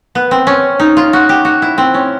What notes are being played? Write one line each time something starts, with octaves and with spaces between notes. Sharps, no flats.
B3
C4
C#4
D#4
F4
F#4
G4
F#4
E4
C4
C#4